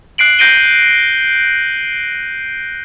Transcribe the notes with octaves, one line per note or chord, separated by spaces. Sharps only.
F#6 C7 D7 F#7
G6 A#6 C7 D7 D#7 G7